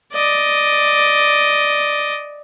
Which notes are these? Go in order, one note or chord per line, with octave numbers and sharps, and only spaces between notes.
D5 D#5